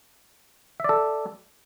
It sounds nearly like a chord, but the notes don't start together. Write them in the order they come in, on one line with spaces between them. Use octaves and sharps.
E5 D5 A4